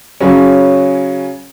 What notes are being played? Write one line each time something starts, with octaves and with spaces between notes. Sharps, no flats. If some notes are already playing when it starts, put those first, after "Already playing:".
C#3 F#3 C#4